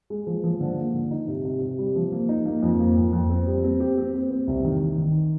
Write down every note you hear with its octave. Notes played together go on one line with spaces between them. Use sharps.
G#3
F3
F3
D3
A#3
D3
D#4
C3
C3
C3
G3
F3
A#3
D#4
A#3
F2
A#3
F2
F2
C4
G3
C4
G4
C4
C4
C4
C2
D#3
D#3
D#3